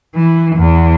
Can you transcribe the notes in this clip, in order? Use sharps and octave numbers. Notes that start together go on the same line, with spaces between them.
E3
E2